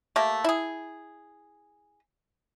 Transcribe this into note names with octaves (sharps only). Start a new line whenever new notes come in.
A3 A#3 G4
E4 G#4